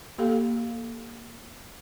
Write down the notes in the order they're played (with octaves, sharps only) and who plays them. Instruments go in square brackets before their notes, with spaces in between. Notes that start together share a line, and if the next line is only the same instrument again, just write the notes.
[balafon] A#3 G4 A4 F5